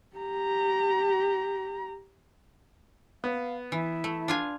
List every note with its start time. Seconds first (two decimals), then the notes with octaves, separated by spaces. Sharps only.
0.16 G4 A#5
3.24 B3 F5
3.72 E3 E4
4.04 A3
4.28 D4 F4 G#5